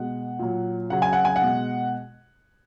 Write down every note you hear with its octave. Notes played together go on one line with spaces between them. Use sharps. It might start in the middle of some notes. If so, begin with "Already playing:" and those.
Already playing: B2 G#3 F#5
A#2 F#3
C#3 F#3 F#5
G#5
F#5
G#5
F#5
B2 G#3